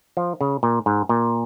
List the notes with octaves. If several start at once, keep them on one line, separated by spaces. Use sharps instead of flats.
F3
C#3
A#2
G#2
A#2